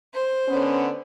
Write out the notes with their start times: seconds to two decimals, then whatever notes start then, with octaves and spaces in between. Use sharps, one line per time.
0.13 C5
0.48 D3 B3 C#4